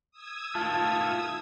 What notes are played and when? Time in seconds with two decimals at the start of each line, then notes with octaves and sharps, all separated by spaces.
0.11 D#6 E6 G#6
0.55 D#3 A3 F4 A5 F6